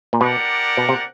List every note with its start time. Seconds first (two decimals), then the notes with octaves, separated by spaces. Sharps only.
0.13 A#2
0.21 B2 D4 G4 A#4 D5 F#5
0.77 B2
0.89 C3